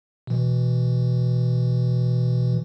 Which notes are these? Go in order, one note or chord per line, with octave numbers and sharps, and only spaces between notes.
B2 E3